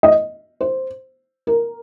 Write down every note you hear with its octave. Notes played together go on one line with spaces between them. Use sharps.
D#5
C5
A#4